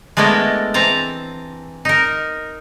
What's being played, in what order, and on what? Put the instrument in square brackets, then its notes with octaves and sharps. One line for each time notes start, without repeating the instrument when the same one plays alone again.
[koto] G#3 A3 B3 D4 E4 A#4
E3 C4 A5 A#5
D#4 A#4